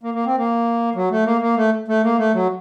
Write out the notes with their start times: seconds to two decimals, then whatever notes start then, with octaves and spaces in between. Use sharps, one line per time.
0.03 A#3
0.14 A#3
0.26 C4
0.38 A#3
0.95 F#3
1.10 A3
1.26 A#3
1.41 A#3
1.56 A3
1.88 A3
2.03 A#3
2.18 A3
2.34 F#3